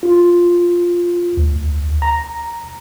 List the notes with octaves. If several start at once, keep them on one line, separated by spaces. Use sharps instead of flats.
F4
D2
A#5